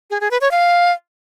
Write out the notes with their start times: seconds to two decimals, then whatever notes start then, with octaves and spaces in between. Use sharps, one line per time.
0.11 G#4
0.21 G#4
0.31 B4
0.41 C#5
0.51 F5